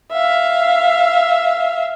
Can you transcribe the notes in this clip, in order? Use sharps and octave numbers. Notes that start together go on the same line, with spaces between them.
E5 F5